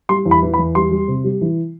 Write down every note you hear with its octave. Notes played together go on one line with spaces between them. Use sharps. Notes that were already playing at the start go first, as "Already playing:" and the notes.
G3 C6
E2
B5
E3
B5
E2
G3 C6
G3
C3
G3
E3